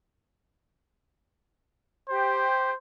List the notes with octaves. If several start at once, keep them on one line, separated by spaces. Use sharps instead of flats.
G4 C5